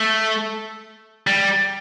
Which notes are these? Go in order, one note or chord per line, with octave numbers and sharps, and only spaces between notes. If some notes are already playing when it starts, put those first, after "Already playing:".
Already playing: A3
G3